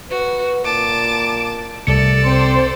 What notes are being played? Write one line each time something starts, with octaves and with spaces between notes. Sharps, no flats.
F#4 B4
A#2 A5 D6
C2 C3 A3 A4 D5 C#7
C4 C5